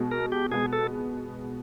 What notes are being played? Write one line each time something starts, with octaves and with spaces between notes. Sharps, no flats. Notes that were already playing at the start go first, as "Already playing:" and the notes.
Already playing: B2 G#3 B3
A#4
G4
B2 G#3 B3 G#4
A4